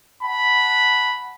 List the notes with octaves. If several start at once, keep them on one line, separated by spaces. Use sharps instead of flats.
F#5 A5 B5